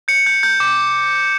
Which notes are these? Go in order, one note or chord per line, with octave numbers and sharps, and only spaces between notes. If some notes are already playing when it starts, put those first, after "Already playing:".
G6 C#7
G6
G6
D6